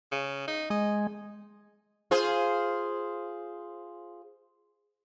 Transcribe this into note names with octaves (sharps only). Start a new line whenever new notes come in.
C#3
D#4
G#3 D#5
F4 G#4 C5